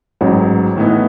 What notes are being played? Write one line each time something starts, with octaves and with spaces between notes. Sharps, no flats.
A1 G#2 F#3
A2 E3 B3 D#4